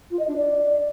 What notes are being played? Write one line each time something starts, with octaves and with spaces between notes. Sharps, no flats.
F4
D#5
D4
D5